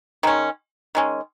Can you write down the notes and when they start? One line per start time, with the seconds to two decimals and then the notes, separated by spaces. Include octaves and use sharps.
0.23 D#3 G#3 C#4
0.95 D#3 G#3 C#4